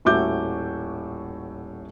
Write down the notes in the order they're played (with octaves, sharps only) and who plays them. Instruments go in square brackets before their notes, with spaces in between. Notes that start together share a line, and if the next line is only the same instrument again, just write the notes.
[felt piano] D#1 A2 F#4 E5 D6 G6